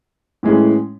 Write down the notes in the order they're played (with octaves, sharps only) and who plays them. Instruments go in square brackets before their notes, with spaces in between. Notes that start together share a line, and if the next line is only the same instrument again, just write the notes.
[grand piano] A2 E3 G#3 C#4